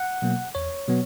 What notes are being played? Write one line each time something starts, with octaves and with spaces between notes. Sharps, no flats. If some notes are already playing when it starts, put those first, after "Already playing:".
Already playing: F#5
B2 F#3 A#3
E2 C#5
B2 F#3 B3